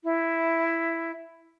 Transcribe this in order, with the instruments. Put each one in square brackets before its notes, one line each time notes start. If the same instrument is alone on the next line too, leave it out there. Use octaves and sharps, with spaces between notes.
[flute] E4